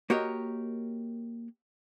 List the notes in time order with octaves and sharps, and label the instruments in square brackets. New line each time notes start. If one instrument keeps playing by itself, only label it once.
[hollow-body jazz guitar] A#3 F#4 G4 A#4 C#5 D#5